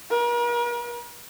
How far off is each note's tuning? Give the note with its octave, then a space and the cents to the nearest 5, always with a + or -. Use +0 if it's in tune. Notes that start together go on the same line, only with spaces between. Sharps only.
A#4 +45